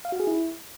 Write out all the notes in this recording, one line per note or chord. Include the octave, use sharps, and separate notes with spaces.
F5
F#4
G#4
E4